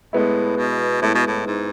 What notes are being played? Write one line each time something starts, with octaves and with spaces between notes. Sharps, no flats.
A2 G#3 B3 E4
B2
A2 G#3 B3 E4
B2
A2
G#2